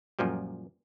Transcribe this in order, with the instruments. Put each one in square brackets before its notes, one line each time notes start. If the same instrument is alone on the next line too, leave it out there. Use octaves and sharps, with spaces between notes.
[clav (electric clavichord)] F#2 A#2 F3 G3